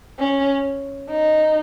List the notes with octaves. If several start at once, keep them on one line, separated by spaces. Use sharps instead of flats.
C#4
D#4